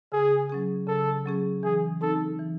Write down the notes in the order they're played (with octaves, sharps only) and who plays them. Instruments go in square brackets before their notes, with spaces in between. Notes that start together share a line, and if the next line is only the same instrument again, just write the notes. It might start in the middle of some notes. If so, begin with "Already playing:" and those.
[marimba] C#3 [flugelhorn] G#4
[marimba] F#3 C#4 G#4
[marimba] C#3 [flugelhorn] A4
[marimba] F#3 C#4 G#4
[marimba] E3 [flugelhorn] G#4
[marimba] C4 D#4 [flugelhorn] A4
[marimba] E3